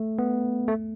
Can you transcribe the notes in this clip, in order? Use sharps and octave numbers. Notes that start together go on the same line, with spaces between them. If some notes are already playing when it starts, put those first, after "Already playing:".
Already playing: A3
B3
A3